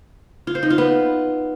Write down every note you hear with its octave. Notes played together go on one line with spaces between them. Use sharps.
F4
C5
D#4
F4
B3